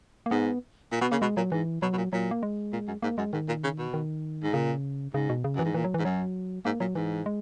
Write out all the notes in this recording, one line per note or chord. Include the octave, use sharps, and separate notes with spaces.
A#3
G#2 B3
A#2
B2 B3
C#3 A#3
B2 G#3
A#2 F#3
G#2 E3
B2 F#3
B2
A#2
A#2 F#3
A#3
G#3
A#2
F#2
G#2 A#3
F#2 G#3
G#2 D#3
A#2
C#3
B2
D#3
G#2
A#2 C#3
G#2 C#3
B2
C#3
F#2 E3
G#2
A#2 E3
F#3
G#2 E3
F#2 F#3
G#2 A#3
A#2 F#3
G#2 E3
G#3